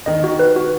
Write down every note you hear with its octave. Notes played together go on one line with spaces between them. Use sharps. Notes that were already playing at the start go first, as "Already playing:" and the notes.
D#3 D#5
F#4
B4
F#4